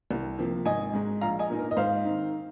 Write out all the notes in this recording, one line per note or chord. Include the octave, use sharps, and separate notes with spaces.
C2
C3 F3 A#3
G#1 D#5 G#5
G#2 G#3 D#4
A#1 F5 A#5
D#5 G#5
A#2 A#3 D#4
A#4
D#5
G#2 C5 F5
D#3 C4 D#4